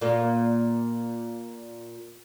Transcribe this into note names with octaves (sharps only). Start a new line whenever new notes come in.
A#2 A#3